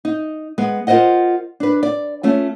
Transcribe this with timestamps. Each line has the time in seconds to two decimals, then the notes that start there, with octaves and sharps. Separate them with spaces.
0.05 D#4
0.58 G#3 B3
0.87 F4 A#4 C5 D#5 F#5
1.60 D4 B4
1.83 D5
2.23 A3 C#4 F4